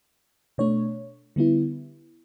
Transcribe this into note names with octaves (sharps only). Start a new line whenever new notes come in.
B2 A3 D4 C#5
D3 G3 B3 E4